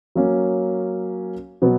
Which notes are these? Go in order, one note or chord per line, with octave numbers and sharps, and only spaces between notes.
F#3 A#3 C#4
B2 F#3 B3